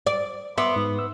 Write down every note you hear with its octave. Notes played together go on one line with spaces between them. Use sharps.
D5
B3 E5 C6 D6
G#2
E6